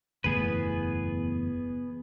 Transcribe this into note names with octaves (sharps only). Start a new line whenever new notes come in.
F#1 E2 A2 B3 G#4 B4